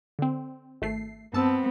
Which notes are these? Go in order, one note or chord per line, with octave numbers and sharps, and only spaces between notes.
D3 C4
G#1 A3 C7
G2 B3 C4 A5 E6